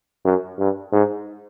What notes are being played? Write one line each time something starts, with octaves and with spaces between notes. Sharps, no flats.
F#2
G2
G#2